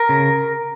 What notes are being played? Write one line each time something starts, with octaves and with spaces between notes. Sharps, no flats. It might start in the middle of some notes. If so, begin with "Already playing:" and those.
Already playing: A#4
C#3